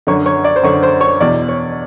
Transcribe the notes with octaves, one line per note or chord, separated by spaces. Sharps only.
F#2 D3 C#5
C#5
D5
C5
F#2 D3 C#5
C5
C#5
E2 B2 D5
C#5